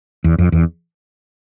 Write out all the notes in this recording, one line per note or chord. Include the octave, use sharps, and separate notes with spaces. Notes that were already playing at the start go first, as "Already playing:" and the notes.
E2
F2
E2